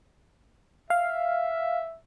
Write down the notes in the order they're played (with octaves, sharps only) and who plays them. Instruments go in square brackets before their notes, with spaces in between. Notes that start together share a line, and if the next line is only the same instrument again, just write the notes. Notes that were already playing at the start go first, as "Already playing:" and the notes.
[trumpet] E5 [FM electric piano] F5